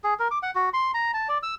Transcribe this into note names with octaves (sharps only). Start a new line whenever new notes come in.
G#4
A#4
D6
F#5
F#4
C6
A#5
A5
D5
E6